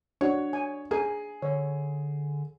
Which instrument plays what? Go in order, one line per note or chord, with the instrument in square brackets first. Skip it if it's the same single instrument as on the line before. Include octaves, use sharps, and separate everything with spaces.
[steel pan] D4 F#4 [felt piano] C#5
[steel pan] G#5
[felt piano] G#4 [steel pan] A#4 G#5
[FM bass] D3 [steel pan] C#5